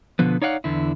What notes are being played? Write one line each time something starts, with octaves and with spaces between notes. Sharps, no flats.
B2 D3 F3 B3
D#4 C#5 D5 F5 F#5
E2 D3 E4